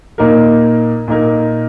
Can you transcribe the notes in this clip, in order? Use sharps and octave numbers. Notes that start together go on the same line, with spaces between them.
A#2 A#3 D#4 A#4
A#2 A#3 D#4 A#4